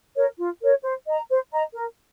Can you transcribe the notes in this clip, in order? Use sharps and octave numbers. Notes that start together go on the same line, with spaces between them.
A#4 C#5
F4
A#4 C#5
C5
D#5 A#5
C5
D#5 A#5
A#4